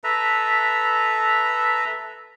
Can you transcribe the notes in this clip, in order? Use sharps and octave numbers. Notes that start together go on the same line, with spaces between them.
A4 B4 E5 A#5